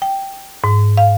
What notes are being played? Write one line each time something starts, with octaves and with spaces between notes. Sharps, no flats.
G5
G#2
F5